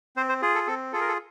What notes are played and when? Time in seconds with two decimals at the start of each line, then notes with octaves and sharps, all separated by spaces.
0.16 C4 C5
0.29 C5
0.42 F4 G#4
0.55 A4
0.67 C4 A4
0.93 F4 G#4 A4
1.01 A#4
1.08 A4